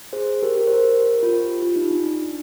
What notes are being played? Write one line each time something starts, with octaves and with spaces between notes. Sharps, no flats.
G#4 C5
G4 A#4
G4 A#4
C5
G4 A#4
F4
G4
F4
D#4
D4
D4